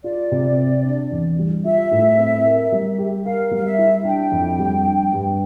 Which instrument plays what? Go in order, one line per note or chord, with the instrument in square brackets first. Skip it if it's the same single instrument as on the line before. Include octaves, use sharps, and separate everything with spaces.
[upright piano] F4 [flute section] D5
[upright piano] C3
C4
D4
E2
G3
[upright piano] F4 [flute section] E5
[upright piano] A2
C4
A#4
G3
G4
[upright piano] A#4 [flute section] F5
[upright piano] G3 [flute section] F5
[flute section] E5
[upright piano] E4
[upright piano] D4 [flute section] G5
[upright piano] F2
G3
D4
G2